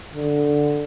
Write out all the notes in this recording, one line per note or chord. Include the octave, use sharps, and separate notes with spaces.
D3